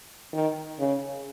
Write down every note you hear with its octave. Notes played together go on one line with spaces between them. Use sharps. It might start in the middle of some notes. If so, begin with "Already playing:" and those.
D#3
C#3